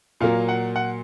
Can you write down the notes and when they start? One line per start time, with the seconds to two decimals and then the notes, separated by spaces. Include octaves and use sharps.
0.20 A#2 F#3 A#3 F5
0.49 F#5
0.76 F#5